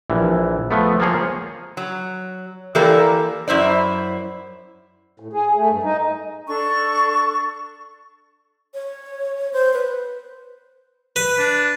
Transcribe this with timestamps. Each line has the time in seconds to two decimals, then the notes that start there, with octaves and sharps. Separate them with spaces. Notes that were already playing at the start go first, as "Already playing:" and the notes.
0.10 A#1 E3
0.71 F3 A3 B3
1.00 F3 A#3 G#4 C#5
1.77 F#3
2.75 E3 A#3 G4 A4 A#4 D5
3.48 F#2 E4 C5 D5
5.20 A2
5.33 G#4
5.56 A3
5.70 G2
5.83 D#4
6.48 D4 A4 C#6
8.74 C#5
9.53 C5
9.73 B4
11.16 B4 B5
11.38 D4